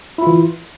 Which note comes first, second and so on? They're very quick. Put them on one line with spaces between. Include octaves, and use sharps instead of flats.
E4 F4 E3